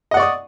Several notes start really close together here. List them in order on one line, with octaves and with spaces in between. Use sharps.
D#5 F#5 D5 C#6 D#6